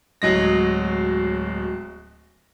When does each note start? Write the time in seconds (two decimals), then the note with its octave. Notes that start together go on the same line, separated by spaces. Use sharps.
0.22 D1 F#3 G#3 A#6